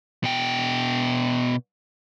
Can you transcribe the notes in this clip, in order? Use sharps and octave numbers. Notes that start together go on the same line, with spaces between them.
B2 G5